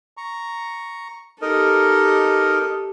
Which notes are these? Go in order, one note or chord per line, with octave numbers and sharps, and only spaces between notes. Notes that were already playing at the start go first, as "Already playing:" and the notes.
A#5 C#6
D#4 G4 A4 A#4 D#5